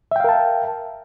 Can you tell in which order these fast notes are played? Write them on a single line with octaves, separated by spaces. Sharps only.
E5 G5 F5 A#4 A5